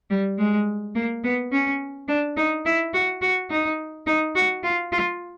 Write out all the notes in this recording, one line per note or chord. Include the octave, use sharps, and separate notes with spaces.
G3
G#3
A#3
B3
C#4
D4
D#4
E4
F#4
F#4
D#4
D#4
F#4
F4
F4